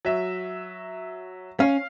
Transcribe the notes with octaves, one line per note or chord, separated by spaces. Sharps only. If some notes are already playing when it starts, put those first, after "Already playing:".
F#3 E5
C#4 F5